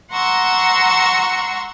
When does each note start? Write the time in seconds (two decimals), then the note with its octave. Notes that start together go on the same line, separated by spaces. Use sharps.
0.12 F#5 A#5 C6 C#6 E6